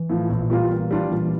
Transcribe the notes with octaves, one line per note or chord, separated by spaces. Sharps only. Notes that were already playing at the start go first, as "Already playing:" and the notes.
Already playing: E3
A2 F3
A#1
A#2 G3 A#3 F4
A#2
G3 D4 F4
A#2 E3